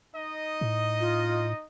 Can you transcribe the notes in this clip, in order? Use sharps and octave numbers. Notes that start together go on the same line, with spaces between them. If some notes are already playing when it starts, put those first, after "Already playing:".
D#4 D#5
A2
F4